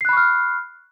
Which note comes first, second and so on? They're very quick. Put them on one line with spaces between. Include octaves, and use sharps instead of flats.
C7 F#6 B5 C#6 F6